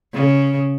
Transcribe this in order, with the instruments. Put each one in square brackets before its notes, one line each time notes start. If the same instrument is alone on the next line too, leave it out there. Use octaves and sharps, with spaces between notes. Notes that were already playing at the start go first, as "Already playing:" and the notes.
[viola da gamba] C#3